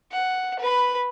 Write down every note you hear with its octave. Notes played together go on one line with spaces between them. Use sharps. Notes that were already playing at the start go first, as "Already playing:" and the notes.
F#5
B4 B5